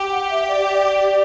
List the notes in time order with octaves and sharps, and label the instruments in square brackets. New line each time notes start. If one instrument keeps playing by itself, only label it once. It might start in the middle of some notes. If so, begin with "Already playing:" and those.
Already playing: [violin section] G4
[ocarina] F#5
F#5
E5
D5
D5